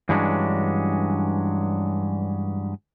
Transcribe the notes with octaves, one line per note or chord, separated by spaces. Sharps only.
G2 E3 F#3 G#3 C#4 D4